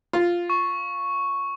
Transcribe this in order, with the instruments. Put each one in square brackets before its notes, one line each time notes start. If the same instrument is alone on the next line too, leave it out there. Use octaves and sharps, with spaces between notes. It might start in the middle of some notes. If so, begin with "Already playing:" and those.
[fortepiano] F4
[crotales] C#6